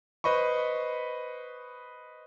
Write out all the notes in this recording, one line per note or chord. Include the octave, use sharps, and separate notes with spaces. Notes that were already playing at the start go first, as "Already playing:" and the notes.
B4 C5 D#5 B5 C#6